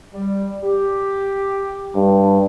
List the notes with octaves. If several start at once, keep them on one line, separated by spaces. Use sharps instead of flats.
G3
G4
G2